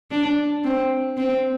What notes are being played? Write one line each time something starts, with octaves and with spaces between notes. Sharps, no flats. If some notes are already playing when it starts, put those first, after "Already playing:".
D4
C4
C4